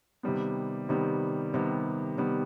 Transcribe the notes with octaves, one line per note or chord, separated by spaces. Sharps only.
C3 D#3 G3 B3
C3 D#3 G3 B3
C3 D#3 G3 B3
C3 D#3 G3 B3